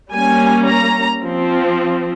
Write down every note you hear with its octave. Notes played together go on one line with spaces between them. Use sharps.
G3 A#3 C#4 G#5
A#5
F3 C4